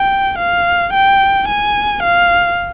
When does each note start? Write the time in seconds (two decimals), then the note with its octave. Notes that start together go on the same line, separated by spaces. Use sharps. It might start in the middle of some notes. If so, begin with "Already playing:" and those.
Already playing: G5
0.39 F5
0.93 G5
1.48 G#5
2.03 F5